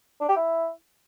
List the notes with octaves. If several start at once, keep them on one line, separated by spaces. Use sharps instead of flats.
D4
G4
E4